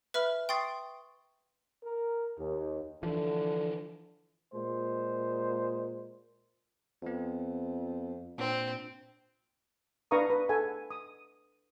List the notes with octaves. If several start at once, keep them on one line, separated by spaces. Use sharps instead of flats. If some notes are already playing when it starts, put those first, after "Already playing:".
B4 E5 B5 F6
G5 C6 C#6 D#6 A6 C7
A#4
D#2
D3 E3 F3
A#2 G#3 C5
F2 B3 C4
A#2 C4 D4
D4 B4 F5 A#5 C#6 D#6
B4
A4 F#5 G#5
D#6